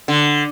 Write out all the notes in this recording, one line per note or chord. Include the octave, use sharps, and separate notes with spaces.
D3